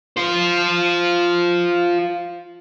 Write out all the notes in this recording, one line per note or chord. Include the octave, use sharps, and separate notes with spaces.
F4 C5